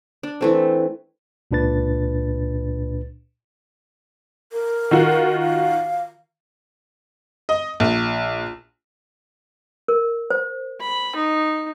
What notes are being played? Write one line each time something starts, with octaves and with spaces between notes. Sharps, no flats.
D4
E3 A3 C4
C#2 A#2 D4 B4 A6
A#4
D#3 F4 F#4
F5
D#5
A#1
A#4
C5
B5
D#4